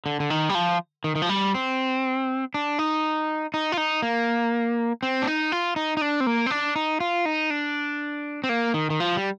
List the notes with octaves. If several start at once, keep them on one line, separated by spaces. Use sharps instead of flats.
D3
D3
D#3
G3
F3
D#3
D#3
F3
G3
C4
D4
D#4
D#4
F4
D#4
A#3
C4
D4
D#4
F4
D#4
D#4
D4
C4
A#3
C4
D4
D#4
F4
D#4
D4
C4
A#3
D#3
D#3
F3
G3